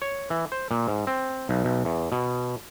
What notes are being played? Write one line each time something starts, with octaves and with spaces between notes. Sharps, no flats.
C#5
E3
C5
A#2
G#2
C4
B1
B1
E2
B2